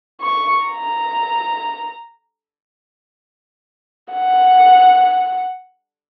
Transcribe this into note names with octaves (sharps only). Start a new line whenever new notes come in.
C#6
A#5
F#5